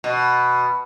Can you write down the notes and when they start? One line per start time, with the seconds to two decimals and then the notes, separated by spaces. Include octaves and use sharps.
0.04 B2